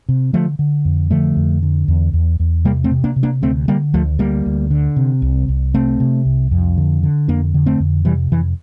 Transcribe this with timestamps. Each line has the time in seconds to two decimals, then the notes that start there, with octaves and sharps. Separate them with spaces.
0.09 C3
0.33 D3 F3 A3
0.59 D3
0.85 F2
1.11 D3 F3 A3
1.36 F2
1.62 D3
1.88 E2
2.13 E2
2.40 E2
2.65 C3 G3 A#3
2.84 A3 C4
2.91 C3
3.04 A#3 D4
3.16 C3
3.23 A#3 D4
3.42 D2 A3 C4
3.68 D3 G3 A#3
3.94 D2 F3 A3
4.19 D2 G3 A#3
4.46 D2
4.71 D3
4.96 C3
5.22 C2
5.48 C2
5.74 C3 A3 C4
6.00 C3
6.25 C2
6.51 F2
6.77 D3
7.03 D3
7.28 F2 A#3 D4
7.54 D3
7.66 A3 C4
7.80 F2
8.05 C3 E3 G3
8.31 F2 E3